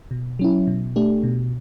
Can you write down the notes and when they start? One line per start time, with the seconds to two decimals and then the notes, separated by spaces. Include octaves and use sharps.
0.11 B2
0.39 F#3 C#4 E4
0.67 B2
0.96 A3 D4 G4
1.23 B2